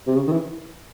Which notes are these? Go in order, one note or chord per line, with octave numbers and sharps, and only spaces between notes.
C3
C#3
D#3
E3